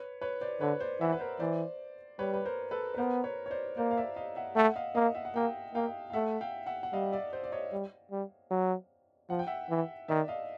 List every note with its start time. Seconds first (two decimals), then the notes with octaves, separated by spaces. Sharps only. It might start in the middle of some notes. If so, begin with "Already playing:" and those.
Already playing: B4 C#5
0.21 B4 C#5
0.41 C5 D5
0.61 D3 B4 C#5
0.80 C5 D5
1.01 E3 E5 F#5
1.12 B4
1.20 A#4 C5
1.40 E3 C5 D5
2.19 G3 B4 C#5
2.34 B4
2.45 A#4 C5
2.71 A4 B4
2.94 B4
2.97 B3 A#4 C5
3.24 B4 C#5
3.46 C#5
3.51 C5 D5
3.77 A#3 C5 D5
3.91 F5
3.97 D5 E5
4.16 D#5 F5
4.36 E5 F#5
4.56 A3 E5 F#5
4.76 D#5 F5
4.95 A#3 D#5 F5
5.15 E5 F#5
5.25 F#5
5.35 A#3 F5 G5
5.75 A#3 F5 G5
6.10 F5
6.13 A3 E5 F#5
6.41 F5 G5
6.66 E5 F#5
6.83 F#5
6.93 G3 D#5 F5
7.12 D5 E5
7.33 C5 D5
7.44 D5
7.52 C#5 D#5
7.72 G3
8.11 G3
8.51 F#3
9.30 F3 F#5
9.39 G5
9.47 E5 F#5
9.70 E3
10.08 D#3 D5 E5
10.28 D#5 F5